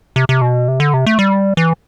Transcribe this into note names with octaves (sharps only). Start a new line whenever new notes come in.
C3
C3
B2
C3
D3
C3
A3
G3
E3